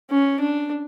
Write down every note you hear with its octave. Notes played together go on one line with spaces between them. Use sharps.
C#4
D4